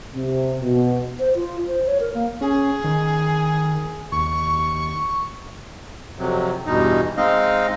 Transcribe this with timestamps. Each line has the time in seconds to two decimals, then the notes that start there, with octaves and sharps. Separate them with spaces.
0.15 C3
0.61 B2
1.19 C5
1.35 F4
1.67 C5
1.87 C#5
2.00 A#4
2.14 A#3
2.41 C#4 G#4
2.84 D#3
4.12 D#2 C#6
6.19 F2 C3 F#3
6.67 E2 G2 B2 D#4
7.17 G#3 C4 D#4 D#5 F5